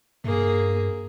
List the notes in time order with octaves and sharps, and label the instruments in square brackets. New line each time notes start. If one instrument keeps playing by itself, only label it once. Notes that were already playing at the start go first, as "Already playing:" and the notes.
[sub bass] G2 [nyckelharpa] A#3 G#4